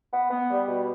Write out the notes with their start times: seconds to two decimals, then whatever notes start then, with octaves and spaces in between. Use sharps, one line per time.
0.12 B3
0.31 B3
0.50 G3
0.68 B2